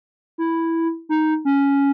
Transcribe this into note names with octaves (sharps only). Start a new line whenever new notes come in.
E4
D#4
C#4